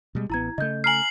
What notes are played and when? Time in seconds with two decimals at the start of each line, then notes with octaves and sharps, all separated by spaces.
0.15 B2 G3 G#3
0.30 A1 B3 E4 A#5 G#6
0.58 C#3 A3 D#5 G6
0.84 G#5 A#5 F6 C7 F#7